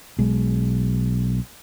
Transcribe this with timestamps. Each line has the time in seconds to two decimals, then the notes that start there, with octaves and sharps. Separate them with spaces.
0.19 B1 G#3